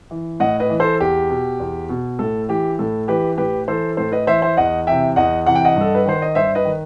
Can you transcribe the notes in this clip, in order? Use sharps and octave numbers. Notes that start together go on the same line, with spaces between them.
E3
A2 D#5 F#5
B4 D#5
E3
A4 C5
E2 G4
B2
E2
B2
A2 A4
E3 G4
A2 A4
E3 G4 B4
A2 G4 B4
E3 A4 C5
A2 A4 C5
B4 D#5
E3 C5 E5
C5 E5
E2 D#5 F#5
C3 E3 E5 G5
E2 D#5 F#5
C3 E3 F#5
G5
D#5 F#5
G2
A4
B4
D#3 C5
D#5
G2 C5 E5
B4 D#5
D#3